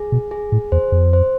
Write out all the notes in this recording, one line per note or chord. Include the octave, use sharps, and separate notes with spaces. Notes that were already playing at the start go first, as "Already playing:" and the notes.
Already playing: G#4
B2
G#4
A2
E2 C5
F2
C5